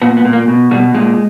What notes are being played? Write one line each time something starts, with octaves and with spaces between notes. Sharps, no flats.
A#2 B3
B3
A#2
A#3
B2
B2 G3
A#2 G#3